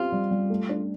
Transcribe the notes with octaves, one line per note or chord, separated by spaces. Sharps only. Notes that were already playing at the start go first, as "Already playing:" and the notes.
Already playing: C4 F4 G4
G3
G3
A3
D4